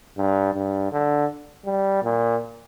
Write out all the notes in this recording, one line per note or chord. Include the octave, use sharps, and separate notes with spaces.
G2
G2
D3
G3
A#2